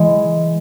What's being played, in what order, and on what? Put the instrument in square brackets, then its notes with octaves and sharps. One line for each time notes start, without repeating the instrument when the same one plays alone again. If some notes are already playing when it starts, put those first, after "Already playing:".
Already playing: [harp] E3 G#3